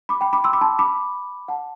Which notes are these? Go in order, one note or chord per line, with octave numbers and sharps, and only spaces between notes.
B5 D6
G5 B5
B5 D6
C6 E6
B5 D6
A5 C6
B5 D6
F#5 A5